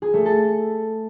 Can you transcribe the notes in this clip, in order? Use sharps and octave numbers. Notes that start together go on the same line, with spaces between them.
G#4
A3
A4